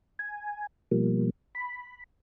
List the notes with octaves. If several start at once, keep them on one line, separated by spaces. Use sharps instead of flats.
G#5
B2 F3 G3 A#3
B5